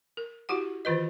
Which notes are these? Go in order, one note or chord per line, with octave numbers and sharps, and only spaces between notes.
A#4
E4 F#4 G4 F#5
D#3 E3 F4 B4 D#5